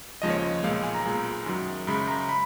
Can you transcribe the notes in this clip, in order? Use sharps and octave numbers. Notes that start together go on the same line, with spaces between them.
D#2 C#3 F3 G#3 D#5
C#5
D#5
B1 A#2 G#3 F5
G#5
A#5
B1 A#2 G#3
F#2 D#3 F#3
F#2 C#3 G#3 B5
A#5
B5